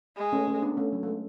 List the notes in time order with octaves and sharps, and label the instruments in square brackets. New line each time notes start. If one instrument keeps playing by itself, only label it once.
[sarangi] G#3
[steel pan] A3 C#4
A3 C#4
B3 D4
A3 C#4
F#3
A3
G#3